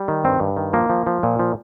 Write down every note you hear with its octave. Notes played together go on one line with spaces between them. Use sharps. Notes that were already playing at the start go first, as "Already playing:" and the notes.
Already playing: G3
D#3
G2 C4
G2
D#3
F3 A#3
F3
F3
A#2
F3